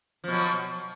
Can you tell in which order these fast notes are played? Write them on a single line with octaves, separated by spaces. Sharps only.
F3 B2 F#3